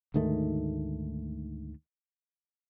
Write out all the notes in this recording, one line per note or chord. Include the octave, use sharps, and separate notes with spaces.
D2 G#2 D#3 A3